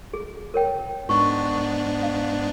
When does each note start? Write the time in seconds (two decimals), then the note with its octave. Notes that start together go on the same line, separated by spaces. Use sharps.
0.14 G#4
0.54 A#4 C#5 G5
1.09 G#2 B3 D4 D#4 C#6
2.03 F5